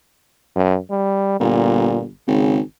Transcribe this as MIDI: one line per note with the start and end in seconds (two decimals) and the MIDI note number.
0.55 0.78 42
0.90 1.39 55
1.40 2.11 31
1.40 2.01 46
2.27 2.60 32
2.27 2.59 49